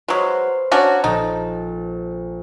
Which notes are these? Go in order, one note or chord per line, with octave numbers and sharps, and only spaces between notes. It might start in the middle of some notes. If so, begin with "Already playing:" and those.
F#3 G#3 B4 C5 F5
C#4 D4 F#4 G#5 A#5
A#1 D#4 A4